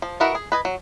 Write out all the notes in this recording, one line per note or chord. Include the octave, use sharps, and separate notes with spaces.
F3
E4 F#4 A#4 B4 D#5
G#4
B4 D#5 G#5
F#3